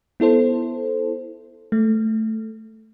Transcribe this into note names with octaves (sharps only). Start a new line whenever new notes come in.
B3 E4 A4 C5
A3